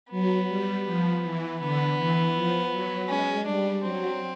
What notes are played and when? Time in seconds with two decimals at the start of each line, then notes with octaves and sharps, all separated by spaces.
0.11 F#3 B3
0.48 G3
0.86 F3
1.23 E3
1.60 D3 B3
1.97 E3
2.34 F3
2.71 F#3
3.08 G#3 C#4
3.45 G3 D4
3.82 F#3 C4